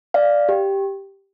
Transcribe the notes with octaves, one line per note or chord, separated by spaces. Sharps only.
D5 F5
G4